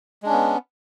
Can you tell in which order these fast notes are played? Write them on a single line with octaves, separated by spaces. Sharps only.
G#3 D4 C#4 B3